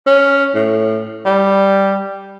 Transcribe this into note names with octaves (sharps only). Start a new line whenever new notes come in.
C#4
A2
G3